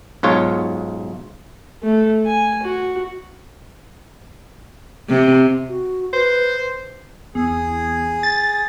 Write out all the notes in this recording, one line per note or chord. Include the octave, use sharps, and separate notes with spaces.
B1 G#2 F4 C#5
A3
G#5
F#4
C3
F#4
B4 C5
E2 G#4
A6